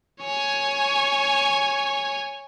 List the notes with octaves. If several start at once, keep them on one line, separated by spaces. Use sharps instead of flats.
C#5 G#5